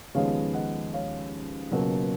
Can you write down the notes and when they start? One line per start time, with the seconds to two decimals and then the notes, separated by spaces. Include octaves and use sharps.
0.14 D#2 C#3 F3 G#3 B3 C#5 F5
0.54 D#5 F#5
0.93 C#5 F5
1.71 C#2 B2 F#3 A#3